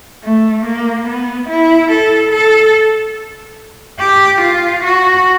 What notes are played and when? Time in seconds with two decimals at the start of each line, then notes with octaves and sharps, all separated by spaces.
0.24 A3
0.65 A#3
1.07 B3
1.49 E4
1.91 A4
2.32 A4
4.00 G4
4.41 F4
4.83 F#4